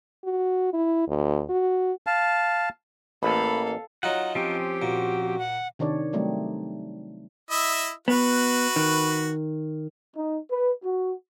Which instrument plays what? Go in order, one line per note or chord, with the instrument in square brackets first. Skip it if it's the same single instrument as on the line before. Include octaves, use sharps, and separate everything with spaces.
[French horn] F#4
E4
D2
F#4
[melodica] F5 A5
[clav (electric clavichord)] A1 [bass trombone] A#3 [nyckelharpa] A4 F5 [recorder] B5
[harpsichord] F#3 D#4 F4 [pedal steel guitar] F#5
[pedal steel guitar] F3 C4 C#4 [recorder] G4
[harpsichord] A#2 [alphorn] F#4
[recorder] F#5
[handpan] C3 D#3 D4 C#5 D5
F#3 G3 A3 C4 D#4
[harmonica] E4 D#5 E5
[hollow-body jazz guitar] B3 [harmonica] F#4 B4
[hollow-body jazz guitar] D#3
[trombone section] D#4
B4
F#4